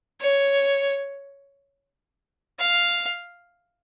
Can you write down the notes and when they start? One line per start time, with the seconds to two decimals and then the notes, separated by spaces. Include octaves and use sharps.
0.20 C#5
2.59 F5